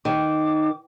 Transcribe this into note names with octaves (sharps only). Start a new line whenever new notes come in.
D#3 D6